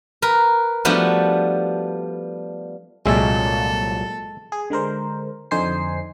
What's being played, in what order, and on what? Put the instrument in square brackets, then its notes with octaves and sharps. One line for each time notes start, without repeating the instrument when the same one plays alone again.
[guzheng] A#4 B4
F3 G3 A3 B3 D4 F#4
[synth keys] C2 A#2 F#3 [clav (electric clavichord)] G#3 E5 [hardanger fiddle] A4
[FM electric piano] G#4
D3 G#3 A#4 C5
F2 D3 D#4 C5 G#5 C7